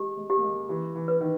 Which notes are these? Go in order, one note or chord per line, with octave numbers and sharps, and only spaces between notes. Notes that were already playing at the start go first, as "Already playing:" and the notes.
Already playing: G#3 G4
G#3
G4
A#3
G#3
E3 G4
E3
B4
D#3